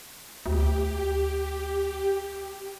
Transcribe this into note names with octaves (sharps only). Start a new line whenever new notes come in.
D2 G4